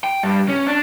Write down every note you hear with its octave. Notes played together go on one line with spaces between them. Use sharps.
G5
G2
C#4
D4